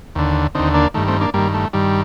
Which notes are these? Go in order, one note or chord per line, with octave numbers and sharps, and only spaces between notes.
D#2 D3
D#2 D3 C4 D#4
A#3 D4
G2 D#3 A3
A3 C4
A#3 D4
G2 D#3 G3 A#3
A3
G2 D#3 G3